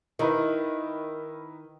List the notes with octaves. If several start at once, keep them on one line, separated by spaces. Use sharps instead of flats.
D#3 D#4 E4 B4